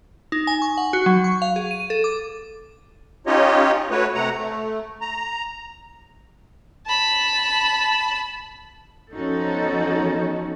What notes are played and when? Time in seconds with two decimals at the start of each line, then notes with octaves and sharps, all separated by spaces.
0.32 D#4
0.47 G#5
0.62 C#6
0.77 F#5
0.93 F#4
1.06 F#3
1.24 C#6
1.42 F5
1.56 G#4
1.71 D#7
1.90 A4
2.04 D6
3.27 C#4 D#4 F4 G4 C#5 D#5
3.91 A3 F#4 B4 C#5
4.15 C3 A3 F#5 A#5
4.38 A3
5.01 A#5
6.86 A5 B5
9.13 F3 B3 C#4 D#4 F#4 A4